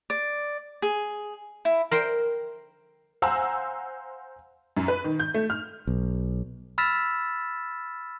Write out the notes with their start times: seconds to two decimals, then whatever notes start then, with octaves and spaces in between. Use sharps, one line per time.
0.10 D5
0.82 G#4
1.65 E4
1.91 A#4 C5 G5
3.22 C5 F5 F#5 G#5 A#5 E6
4.77 F#2
4.88 B4
5.04 D#3
5.20 G6
5.34 A3
5.50 F6
5.87 B1
6.78 B5 E6 F6 A6 B6 E7